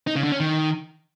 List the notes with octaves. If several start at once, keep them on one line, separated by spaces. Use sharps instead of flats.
D#4
C#3
D3
C#4
D#3